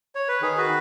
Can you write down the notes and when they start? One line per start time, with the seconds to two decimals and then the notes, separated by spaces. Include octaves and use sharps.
0.15 C#5
0.28 B4
0.41 D#3 G#4
0.57 F#4 B4